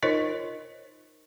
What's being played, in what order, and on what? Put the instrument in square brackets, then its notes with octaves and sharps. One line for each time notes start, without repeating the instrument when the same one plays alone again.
[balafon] D#4 F4 A#4 C5 C#5 D#5